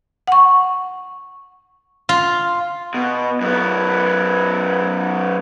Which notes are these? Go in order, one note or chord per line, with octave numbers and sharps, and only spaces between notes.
F#5 C#6
F4
B2
F#2 B3